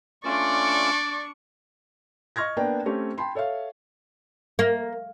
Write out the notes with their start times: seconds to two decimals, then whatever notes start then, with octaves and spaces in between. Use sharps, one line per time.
0.25 A3 C#4 D4 F4 D5 C#6
2.36 D#5 C#6 F6 G#6 A#6
2.57 A#3 B3 D4 D5 G5
2.86 A3 C4 C#4 G4 C#5
3.18 G5 A5 B5 C6
3.35 A4 C#5 E5 F5
4.59 A#3